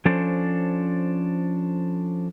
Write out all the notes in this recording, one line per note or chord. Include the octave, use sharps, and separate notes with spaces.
F3 C#4 D4 A4 C5